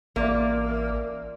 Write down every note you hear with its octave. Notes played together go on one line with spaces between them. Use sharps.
A1 A#3 F4 D5 E5